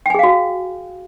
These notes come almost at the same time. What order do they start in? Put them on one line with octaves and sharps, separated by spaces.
G5 G#5 G#4 F5 F#4